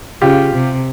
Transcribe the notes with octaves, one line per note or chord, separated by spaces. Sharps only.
C#3 F4 G4
C3